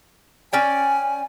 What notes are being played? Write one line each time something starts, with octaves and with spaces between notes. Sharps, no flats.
C#4 D5 G5 G#5